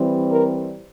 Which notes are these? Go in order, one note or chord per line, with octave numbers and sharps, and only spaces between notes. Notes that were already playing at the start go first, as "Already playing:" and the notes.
Already playing: E3 G3 C4
A#4